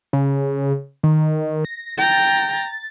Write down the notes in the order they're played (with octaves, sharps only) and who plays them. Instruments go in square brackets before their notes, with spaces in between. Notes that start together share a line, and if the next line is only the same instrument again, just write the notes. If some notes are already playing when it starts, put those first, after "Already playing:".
[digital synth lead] C#3
D#3
A#6
[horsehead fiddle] G5 A#5 [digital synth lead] A6